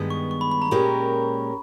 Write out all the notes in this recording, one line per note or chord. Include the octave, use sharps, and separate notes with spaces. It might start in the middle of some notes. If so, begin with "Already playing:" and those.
Already playing: G2 D#3 G#3 B3
C#6
C#6
B5
B5
A#5
A#2 G#3 C#4 G4 A#4